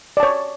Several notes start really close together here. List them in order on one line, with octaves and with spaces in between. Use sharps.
D5 A5 C#5